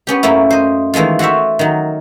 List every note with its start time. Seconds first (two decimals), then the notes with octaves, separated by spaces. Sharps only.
0.07 B3 C#4 G4
0.23 F#2 A3 A#3 C#4 E4
0.50 C5 D#5
0.94 D#3 E3 G#3 A3 F4
1.19 F#4 A4 C5 C#5 E5
1.59 D#3 F#3